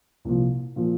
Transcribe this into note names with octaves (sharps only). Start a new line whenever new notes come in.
C2 A#2 F3
A#2 F3